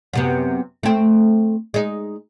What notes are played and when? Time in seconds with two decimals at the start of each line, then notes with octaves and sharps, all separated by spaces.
0.13 F#2 C3 B3
0.83 A3 C4
1.74 G#3 D#4